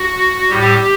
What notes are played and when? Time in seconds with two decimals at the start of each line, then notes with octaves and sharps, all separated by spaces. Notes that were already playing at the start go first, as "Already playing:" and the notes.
Already playing: F#4
0.50 A2 G3 G4